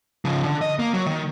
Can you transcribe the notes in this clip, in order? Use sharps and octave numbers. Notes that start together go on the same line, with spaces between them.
C#3 F3
D3
D#5
A#3
F#3
D#3